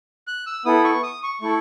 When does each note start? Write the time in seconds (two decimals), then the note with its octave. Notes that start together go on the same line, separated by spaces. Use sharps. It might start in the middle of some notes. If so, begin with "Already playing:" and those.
0.27 F#6
0.46 E6
0.65 B3 E4 A4 D#6
0.84 C#6
1.03 D#6
1.23 C#6
1.41 A3 E4 A4 C#6